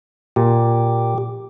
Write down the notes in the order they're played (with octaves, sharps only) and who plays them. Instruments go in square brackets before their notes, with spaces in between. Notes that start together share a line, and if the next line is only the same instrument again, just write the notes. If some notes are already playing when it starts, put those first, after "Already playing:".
[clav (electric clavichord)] A#2 [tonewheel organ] G4